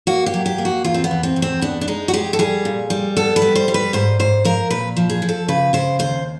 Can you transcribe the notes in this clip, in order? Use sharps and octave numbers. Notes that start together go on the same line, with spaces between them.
A#3 F#4
G4
F#3
G4
A#3
F#4
E2 F4
C4
B3
E2
C4
E2
C4
B3 D4
D4
G#3 D#4
F#4
G#3 G4
A4
G3 G#4
A#2
G3
B3 A4
B4
G3
C5
G3
B4
G#2 C5
G#2 C5
F3 A#4
A#2 B4
F3
G#4
F3
A4
C#3 B4
C#3 C5
D#2 C5